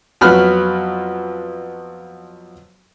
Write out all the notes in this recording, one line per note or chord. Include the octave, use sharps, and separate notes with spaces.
F2 F#3 B3 F#4 B5 F6